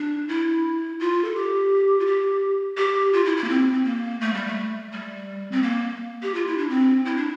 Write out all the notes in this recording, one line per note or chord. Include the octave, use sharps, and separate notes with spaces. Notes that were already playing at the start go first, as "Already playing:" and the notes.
Already playing: D4
E4
F4
A4
G4
F4
G4
G4
F4
E4
E4
A#3
C4
C4
A#3
A3
G3
A3
G3
C4
A#3
G4
F4
E4
D4
C4
E4
D4